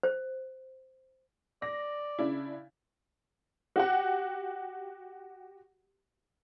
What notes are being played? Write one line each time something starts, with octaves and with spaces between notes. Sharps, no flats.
C5
D5 A#6
C#3 D4 E4
F#4 G4 F#5